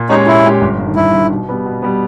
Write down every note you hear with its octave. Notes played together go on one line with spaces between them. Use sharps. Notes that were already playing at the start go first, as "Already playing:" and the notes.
Already playing: A#2
G#3 C#4 D#4 G4 C#5
A#2 E4
G#3 C#4 G4 C#5
G1
G2
D#3
G1 E4
G2 D#3
B2
G3 B3
B2
G3 B3